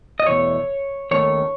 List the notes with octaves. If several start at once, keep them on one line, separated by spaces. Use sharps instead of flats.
D#5
E2 B2 A3 C#5
D#2 D#3 A3 C#4 C#5